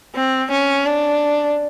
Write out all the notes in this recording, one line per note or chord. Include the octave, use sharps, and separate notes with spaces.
C4
C#4
D4